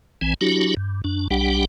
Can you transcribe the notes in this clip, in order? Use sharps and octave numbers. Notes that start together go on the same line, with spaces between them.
A#1 E3 C4 G#5
F#3 D4 E4 F#4 G4
G2
F#2 D4
B1 G3 D4 G4 F#5 G5